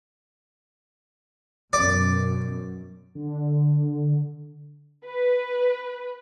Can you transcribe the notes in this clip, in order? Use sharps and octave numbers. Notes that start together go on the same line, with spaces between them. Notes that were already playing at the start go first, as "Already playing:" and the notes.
F#2 B2 D5
D3
B4